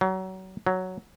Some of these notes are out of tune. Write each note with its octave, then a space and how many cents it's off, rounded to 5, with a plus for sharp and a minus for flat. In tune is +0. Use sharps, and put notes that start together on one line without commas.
F#3 +30
F#3 +5